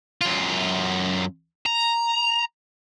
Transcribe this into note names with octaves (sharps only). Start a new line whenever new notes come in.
F#2 F4
A#5